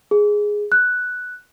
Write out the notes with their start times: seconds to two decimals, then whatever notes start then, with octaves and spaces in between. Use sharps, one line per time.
0.11 G#4
0.72 F#6